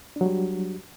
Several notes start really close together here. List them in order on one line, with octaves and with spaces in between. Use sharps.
D4 F#3 G3